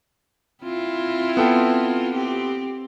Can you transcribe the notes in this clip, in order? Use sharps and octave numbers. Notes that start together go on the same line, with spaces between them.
C4 E4 F4
B3 A4 G5
C4 G4